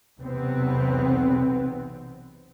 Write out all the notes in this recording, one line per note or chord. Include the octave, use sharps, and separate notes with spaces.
B1 E2 C3 B3 C4